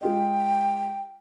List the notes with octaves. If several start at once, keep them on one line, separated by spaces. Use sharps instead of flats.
G#3 F4 D#5 G5